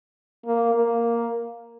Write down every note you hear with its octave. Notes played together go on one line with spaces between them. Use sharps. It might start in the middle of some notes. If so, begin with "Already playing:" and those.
A#3
A#3